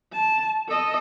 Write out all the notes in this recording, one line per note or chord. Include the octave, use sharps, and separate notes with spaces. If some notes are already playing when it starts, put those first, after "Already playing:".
A5
A4 D#5